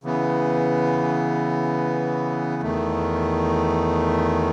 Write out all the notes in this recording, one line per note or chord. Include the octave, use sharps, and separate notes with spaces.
C#3 E3 B3
E2 D#3 A3